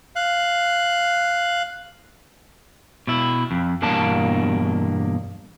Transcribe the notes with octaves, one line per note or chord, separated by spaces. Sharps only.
F5 F#6
B2 E4
F2
E2 G2 B2 A#3 D4 A5